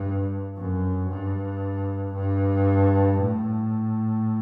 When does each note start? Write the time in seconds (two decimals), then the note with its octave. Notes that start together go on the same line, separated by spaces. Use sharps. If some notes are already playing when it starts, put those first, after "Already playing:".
Already playing: G2
0.57 F#2
1.09 G2
2.14 G2
3.19 A2